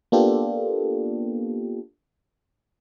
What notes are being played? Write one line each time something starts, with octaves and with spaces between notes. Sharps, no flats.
A#3 B3 D4 F4 G4 A4